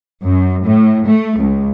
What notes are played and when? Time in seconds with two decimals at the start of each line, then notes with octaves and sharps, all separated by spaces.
0.24 F#2
0.66 A2
1.07 A3
1.40 C#2